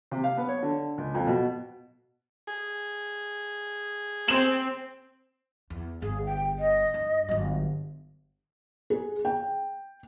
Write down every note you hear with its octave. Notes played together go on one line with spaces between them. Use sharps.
C3
F5
B3
C#5
D3
C#2
F2
B2
G#4
C4 E7 F#7
E2
G1 G#4
G5
D#5
G2
G1 F#3
G#4
G5